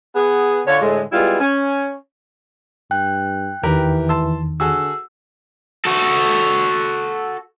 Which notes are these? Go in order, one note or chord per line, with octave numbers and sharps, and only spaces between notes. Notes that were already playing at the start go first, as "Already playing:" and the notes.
B3 G#4
D3 F4 C#5
A2 D3 G#3
G3 G#3 B3 E4 F4
C#4
G2 G5 F#6
E2 D#3 E3 G4 A#4 B4
A5 C6 E6
D3 F#4 G#4 A4 E6
F#4 A4